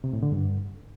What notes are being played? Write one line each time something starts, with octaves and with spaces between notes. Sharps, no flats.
C3
A2
D3
G2